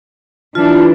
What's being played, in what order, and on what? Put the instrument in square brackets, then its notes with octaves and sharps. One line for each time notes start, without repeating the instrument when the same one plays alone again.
[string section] E3 D4 [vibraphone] F4